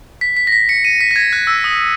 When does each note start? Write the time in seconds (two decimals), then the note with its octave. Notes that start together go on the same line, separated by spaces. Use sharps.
0.21 B6
0.37 B6
0.47 A#6
0.52 B6
0.69 C#7
0.85 D#7
1.01 B6
1.11 A#6
1.16 G#6
1.33 F#6
1.47 E6
1.64 D#6